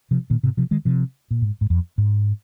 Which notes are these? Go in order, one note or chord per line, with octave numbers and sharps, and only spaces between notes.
C3 F3
A#2 D#3
G#2 C3
C3 F3
D#3 G#3
C3 F3
A#2
G#2
G#2
F2
G#2